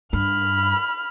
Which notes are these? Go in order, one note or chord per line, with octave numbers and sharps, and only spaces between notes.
G2 B5 F6